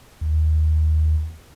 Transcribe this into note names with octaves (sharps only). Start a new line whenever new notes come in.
D#2